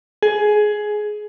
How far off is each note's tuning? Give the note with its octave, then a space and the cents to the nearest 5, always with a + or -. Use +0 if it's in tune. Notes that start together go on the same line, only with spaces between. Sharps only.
G#4 +15